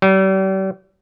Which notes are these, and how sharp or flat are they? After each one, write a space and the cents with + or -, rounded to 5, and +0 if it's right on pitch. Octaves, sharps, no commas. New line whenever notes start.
G3 -40